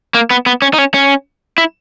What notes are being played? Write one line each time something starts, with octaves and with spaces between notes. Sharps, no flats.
A#3
B3
B3
C#4
D#4
C#4
C#4
E4